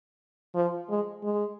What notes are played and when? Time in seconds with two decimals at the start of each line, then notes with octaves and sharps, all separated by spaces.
0.55 F3
0.90 G#3
1.23 G#3